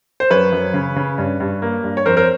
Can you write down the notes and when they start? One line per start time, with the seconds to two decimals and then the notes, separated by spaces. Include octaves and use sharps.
0.20 C5
0.30 F#2 B4 C#5
0.53 F#2
0.74 C#3
0.96 C#3
1.18 G2
1.40 G2
1.62 A#3
1.84 G2
1.97 C#5
2.06 F2 A#4 C5
2.17 A#4 C5